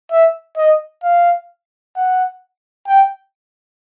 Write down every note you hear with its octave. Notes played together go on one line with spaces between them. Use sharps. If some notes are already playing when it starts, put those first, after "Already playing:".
E5
D#5
F5
F#5
G5